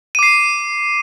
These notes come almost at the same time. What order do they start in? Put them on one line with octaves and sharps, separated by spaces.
D#7 D6 C7